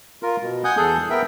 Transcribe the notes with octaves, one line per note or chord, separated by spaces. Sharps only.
F4 A#4
B2
F#5 G#5 D#6 G6
E2 G#4 A4 G6
B3 A#4 E5 G5